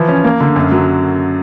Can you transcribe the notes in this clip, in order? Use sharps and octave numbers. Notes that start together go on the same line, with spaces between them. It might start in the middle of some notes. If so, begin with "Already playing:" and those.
Already playing: E3 F3
C#4
A#3
D3
F#2
F#3